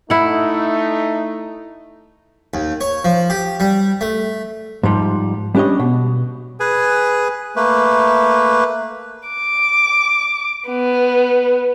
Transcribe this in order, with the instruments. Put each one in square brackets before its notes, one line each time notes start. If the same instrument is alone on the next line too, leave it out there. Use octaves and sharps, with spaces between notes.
[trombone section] A3 D#4 [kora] E4 F#5
[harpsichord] D#2
C#5
F3
G4
G3
A3
[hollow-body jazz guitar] G#2 F3 G3
G3 C#4 D4 G4 C#5 D#5
B2
[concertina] G#4 B4 G#5
A3 A#3 B4
[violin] D6
B3